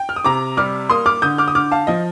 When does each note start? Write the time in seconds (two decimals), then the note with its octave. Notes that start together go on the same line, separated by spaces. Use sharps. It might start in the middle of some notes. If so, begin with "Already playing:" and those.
Already playing: G5
0.09 F6
0.16 D#6
0.25 C3 A#5 D6
0.57 G3 D6 F6
0.90 A#3 C6 D#6
1.06 D6 F6
1.22 D3 D#6 G6
1.38 D6 F6
1.48 D#6
1.55 D3 D6 F6
1.72 F5 A5
1.87 F3 D#5